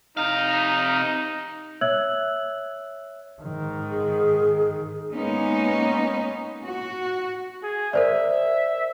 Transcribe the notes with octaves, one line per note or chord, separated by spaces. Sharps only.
C3 D#4 F5
C#5 E5 E6 F#6 G#6 F#7
G#2 D#3
G#4
G#3 A#3 B3 C#4 D#4
F#4
G#4
A#4 C5 D5 E5